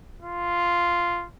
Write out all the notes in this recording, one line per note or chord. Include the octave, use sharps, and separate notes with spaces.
F4